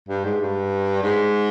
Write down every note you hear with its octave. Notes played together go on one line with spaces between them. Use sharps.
G2
G#2
G2
G#2